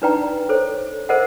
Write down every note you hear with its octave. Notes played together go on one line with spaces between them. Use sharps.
D4 D#4 B4 D5 G5 A#5
A4 C5 C#5
A4 A#4 C5 D#5 E5 F#5